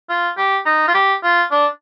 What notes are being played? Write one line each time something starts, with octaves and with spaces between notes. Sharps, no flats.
F4
G4
D#4
F4
G4
F4
D4